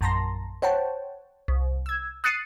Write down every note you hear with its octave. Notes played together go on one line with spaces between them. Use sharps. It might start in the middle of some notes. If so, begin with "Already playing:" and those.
A#1 F#2 A5 A#5 C6 A#6
C5 C#5 F#5 G5 A5
C2
E6 G#6
D#6 F#6 A6 C7 C#7 D#7